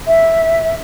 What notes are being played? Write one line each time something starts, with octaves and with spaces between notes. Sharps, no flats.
E5